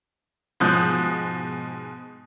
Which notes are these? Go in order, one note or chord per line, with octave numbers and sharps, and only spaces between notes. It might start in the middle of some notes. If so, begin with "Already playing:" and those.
G#2 B2 F3 D#6 F#6 G6